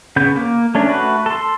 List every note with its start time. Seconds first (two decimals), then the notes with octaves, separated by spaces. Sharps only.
0.16 C#3 B3 G6
0.36 A#3
0.75 A3 C#4 D4
0.89 A3 F#4 B4
1.26 A4 C6